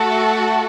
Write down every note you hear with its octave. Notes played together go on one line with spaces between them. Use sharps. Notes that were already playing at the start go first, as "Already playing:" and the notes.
Already playing: A3 F#4 A4